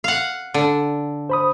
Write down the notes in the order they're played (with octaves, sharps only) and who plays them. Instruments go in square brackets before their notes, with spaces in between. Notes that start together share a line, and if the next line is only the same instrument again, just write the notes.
[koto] F5 F#5
D3
[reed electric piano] C5 B5 D#6